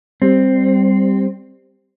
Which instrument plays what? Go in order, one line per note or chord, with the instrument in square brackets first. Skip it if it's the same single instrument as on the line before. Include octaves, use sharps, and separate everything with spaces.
[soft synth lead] G3 [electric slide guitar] C4